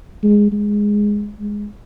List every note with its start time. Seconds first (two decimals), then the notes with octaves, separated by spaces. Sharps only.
0.23 G#3
0.52 G#3
1.40 G#3